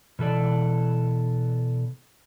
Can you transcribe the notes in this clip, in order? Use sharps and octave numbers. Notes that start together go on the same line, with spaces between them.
B2 E3 A4 D5